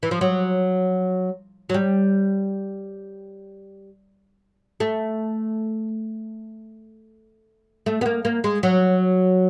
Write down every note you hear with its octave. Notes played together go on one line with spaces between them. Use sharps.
E3
F3
F#3
F#3
G3
A3
A3
B3
A#3
A#3
G#3
F#3